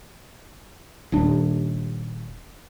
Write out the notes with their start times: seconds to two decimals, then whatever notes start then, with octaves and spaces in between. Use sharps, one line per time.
1.12 D#1 D#2 D4